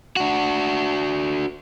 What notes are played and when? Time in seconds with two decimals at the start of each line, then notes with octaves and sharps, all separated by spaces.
0.16 D4 F#4